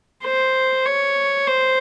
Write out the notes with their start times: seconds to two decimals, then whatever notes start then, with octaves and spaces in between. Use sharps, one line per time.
0.24 C5
0.86 C#5
1.47 C5